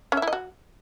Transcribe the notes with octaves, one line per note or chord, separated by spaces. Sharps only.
C#4
E5
E4
D#5
F#4